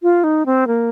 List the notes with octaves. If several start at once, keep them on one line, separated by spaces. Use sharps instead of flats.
F4
D#4
C4
A#3